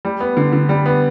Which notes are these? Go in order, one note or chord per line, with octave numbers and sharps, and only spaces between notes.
G3
B3
D3
D3
G3
B3